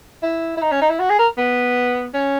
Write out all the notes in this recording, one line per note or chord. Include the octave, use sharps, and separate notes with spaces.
E4
E4
D#4
C#4
D#4
E4
F#4
G#4
A#4
B3
C#4